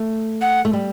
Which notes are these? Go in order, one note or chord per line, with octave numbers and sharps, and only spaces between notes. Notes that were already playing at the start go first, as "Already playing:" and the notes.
Already playing: A3
F#5
A3
G3